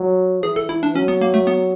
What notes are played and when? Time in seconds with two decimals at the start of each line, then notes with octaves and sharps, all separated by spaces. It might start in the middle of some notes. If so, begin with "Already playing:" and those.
Already playing: F#3
0.43 E3 G#4
0.56 A4
0.69 E4
0.83 D4
0.95 F#3 C#4
1.08 B3
1.21 A#3
1.34 A3
1.47 B3